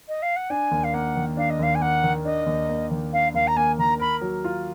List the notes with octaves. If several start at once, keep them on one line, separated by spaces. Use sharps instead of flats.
D#5
F5
F#5
D4 G#5
D#2
F5
A#3 F#5
D#3
D4 F5
D#5
D#2 F5
G#5
A#3 F#5
D#3
D4 D#5
D#2
A#3
D#3
D4 F5
D#2 F5
A#5
A#3 G#5
D#3 A#5
A#4 B5
F#3
F4